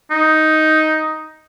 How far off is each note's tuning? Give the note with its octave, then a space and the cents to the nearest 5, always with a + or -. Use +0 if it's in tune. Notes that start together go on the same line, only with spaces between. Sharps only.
D#4 +5